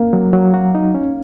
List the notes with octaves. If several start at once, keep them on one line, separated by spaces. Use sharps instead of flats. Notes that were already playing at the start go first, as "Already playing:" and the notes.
Already playing: A#3
F#3
F#3
F#4
D#4
C#4